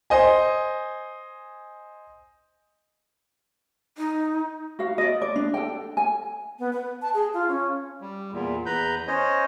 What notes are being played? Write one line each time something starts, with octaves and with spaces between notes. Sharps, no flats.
C5 D#5 G#5
D#4
F#4 F5
D5 D#5
D5
D4
A4 G5
G#5
B3
B4
A5
G#4
F4
C#4
G3
E2 A#2
E2 B4 A#5 B5 G6
C#4 C5 C#5 D#5